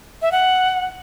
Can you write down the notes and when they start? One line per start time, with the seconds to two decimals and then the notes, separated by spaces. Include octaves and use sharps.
0.22 E5
0.32 F#5